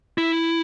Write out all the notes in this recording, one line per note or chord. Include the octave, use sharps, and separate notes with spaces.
E4